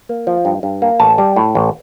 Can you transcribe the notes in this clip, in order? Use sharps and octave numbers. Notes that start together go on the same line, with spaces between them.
A#3
F3
G2
G2
A#3
A1 A5
G3
A2
A1